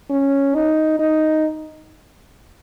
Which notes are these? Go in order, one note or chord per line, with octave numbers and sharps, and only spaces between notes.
C#4
D#4
D#4